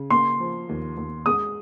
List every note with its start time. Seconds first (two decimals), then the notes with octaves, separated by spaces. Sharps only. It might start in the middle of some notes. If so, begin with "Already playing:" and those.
Already playing: C#3
0.10 A#3 C6
0.40 F3
0.69 D#2
0.97 D#2
1.26 G#3 D#6